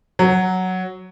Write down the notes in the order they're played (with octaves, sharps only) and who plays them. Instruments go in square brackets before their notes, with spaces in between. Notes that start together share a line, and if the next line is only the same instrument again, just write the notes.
[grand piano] F#3